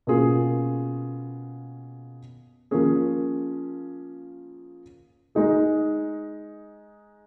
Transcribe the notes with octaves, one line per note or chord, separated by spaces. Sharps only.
B2 A#3 C#4 F4 G#4
F3 A#3 C#4 G#4
G#3 D#4 G#4